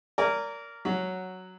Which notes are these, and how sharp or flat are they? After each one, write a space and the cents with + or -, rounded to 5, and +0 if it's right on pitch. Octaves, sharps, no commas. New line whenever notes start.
A#4 -10 D5 -30 G#5 -25
F#3 +0 C#4 +0 F#4 +0